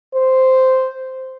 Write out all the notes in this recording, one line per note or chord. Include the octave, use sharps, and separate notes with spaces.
C5